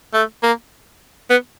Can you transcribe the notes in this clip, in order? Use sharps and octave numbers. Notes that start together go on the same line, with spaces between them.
A3
A#3
B3